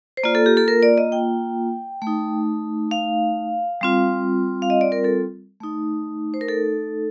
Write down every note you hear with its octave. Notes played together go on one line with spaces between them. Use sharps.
C5
A#3 F4 D5
A4
G4
A4
A#4
D5
D#5
G5
A3
D#4
F5
G3 C4 F4
F5
D#5
D5
A#4
A4
A3 D#4
C5
A#4
A4